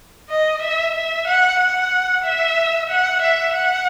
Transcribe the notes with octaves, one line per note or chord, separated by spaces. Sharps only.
D#5
E5
E5
F#5
F#5
E5
F#5
E5
F#5